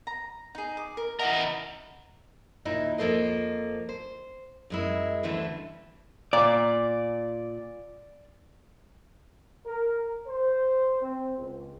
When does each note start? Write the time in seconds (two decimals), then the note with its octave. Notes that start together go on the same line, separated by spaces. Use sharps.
0.07 A#5
0.55 D#4 G#4
0.77 D6
0.97 A#4
1.19 E3 A#4 D#5 E5 F#5
2.65 D#2 A#2 D#4 E4
2.98 F2 F3 A#3 A4 C5 D#5
3.89 C5
4.70 F#2 G#3 E4
5.23 D2 D3 E3 G3 A3 C4
6.33 A#2 D5
9.66 A#4
10.27 C5
11.02 C4
11.38 C#2